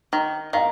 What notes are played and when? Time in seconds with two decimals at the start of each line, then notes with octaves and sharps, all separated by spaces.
0.13 D#3
0.53 D#3 F5